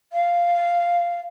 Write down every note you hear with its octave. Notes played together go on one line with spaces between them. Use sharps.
F5